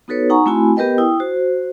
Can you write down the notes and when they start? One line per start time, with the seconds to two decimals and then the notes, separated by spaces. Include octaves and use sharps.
0.08 B3 D#4 F#4 A4 B4 C#5
0.30 D#4 F#5 G#5 A#5 C#6
0.46 A3 C4 E4 F#4 G#5 B5
0.76 B3 G4 A#4 B4 D#5 G5
0.98 E4 G5 D#6
1.20 F#4 C5